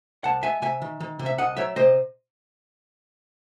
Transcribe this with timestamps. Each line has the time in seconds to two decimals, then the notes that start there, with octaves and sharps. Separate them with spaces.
0.24 C2 F#5 A5
0.43 G#3 E5 G#5
0.62 C3 E5 G#5
0.82 D#3
1.00 D#3
1.19 C3
1.26 E5
1.38 C2 D#5 F#5
1.57 F#3 C#5 E5
1.76 C3 C5 D#5